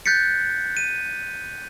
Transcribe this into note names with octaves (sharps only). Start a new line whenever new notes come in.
F#6 G6 A6 B6 C#7
D#7